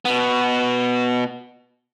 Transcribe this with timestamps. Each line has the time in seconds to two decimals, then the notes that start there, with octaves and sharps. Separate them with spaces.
0.05 B2 B3